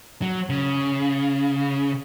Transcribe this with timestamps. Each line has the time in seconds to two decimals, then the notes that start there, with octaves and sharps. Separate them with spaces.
0.22 F#3
0.49 C#3